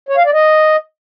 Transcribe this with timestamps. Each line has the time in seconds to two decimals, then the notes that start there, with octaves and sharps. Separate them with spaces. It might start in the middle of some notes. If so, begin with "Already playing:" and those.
0.09 C#5
0.17 F5
0.25 D5
0.33 D#5